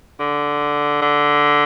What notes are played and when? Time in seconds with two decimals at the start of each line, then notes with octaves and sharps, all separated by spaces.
0.19 D3
1.02 D3